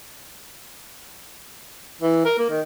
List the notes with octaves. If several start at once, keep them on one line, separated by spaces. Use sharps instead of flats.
E3
A#4
A#3
D#3